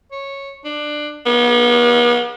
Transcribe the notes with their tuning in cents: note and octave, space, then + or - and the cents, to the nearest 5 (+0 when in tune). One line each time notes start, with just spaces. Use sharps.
C#5 -10
D4 +20
B3 -40